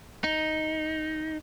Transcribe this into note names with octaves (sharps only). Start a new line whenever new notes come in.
D#4